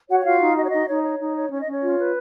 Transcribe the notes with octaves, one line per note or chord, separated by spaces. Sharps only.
F#4 C#5 F#5
F#5
F4 F#4 F5
D#4
F#4 D#5
C#5
D#4 D#5
D#4 C#5
C#5
D#4
C#5
C#4 C#5
D#5
C#4 C#5
F4
B4